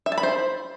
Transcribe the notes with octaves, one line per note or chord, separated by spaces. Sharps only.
E5
A5
B5
C5